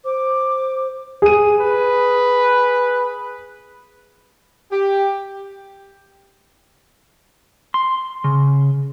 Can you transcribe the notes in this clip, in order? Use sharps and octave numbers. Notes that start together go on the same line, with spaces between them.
C5 D6
G#4 D#7
B4
G4
C6
C#3